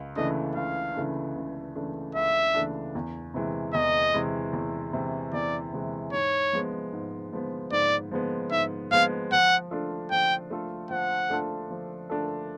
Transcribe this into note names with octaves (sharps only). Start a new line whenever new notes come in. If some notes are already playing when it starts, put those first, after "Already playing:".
Already playing: C#2
C#3 E3 A3 D4 D#5
C#2 F5
C#3 E3 A3 D4
C#2
C#3 E3 A3 D4
C#2 E5
C#3 E3 A3 D4
E2
C3 E3 G#3
E2 D#5
C3 E3 G#3
E2
C3 E3 G#3
E2 D5
C3 E3 G#3
G#2 C#5
F3 G#3 B3
G#2
F3 G#3 B3
G#2 D5
F3 G#3 B3
G#2 E5
F3 G#3 B3 F5
F3 F#5
A3 D4 F4 A4
F3 G5
A3 D4 F4 A4
F3 F#5
A3 D4 F4 A4
F3
A3 D4 F4 A4